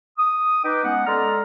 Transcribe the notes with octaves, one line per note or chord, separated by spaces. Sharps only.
D#6
D#4 B4 D#5 G5 D6
G#3 B3 C#4 F#5
G#3 A4 D5 A#5 C6 F6